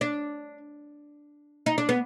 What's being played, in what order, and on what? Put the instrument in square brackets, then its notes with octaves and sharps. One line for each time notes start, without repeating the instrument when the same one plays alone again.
[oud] D4
D#4
D4
B3